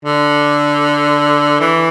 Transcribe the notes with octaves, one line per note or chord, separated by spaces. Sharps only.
D3
E3